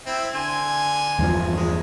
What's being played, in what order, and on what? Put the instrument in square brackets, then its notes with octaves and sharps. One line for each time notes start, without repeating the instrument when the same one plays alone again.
[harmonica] C4 E4
D3 G#5 C6
[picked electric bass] E2 G2 F3
[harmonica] G#3